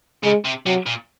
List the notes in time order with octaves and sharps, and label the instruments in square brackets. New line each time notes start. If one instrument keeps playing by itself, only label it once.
[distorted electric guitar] C#3 [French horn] G#3
[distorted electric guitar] C3
[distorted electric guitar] C3 [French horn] F#3
[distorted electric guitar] A#2